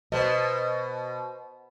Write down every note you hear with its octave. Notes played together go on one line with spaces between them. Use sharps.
B2 B4 C5 D#5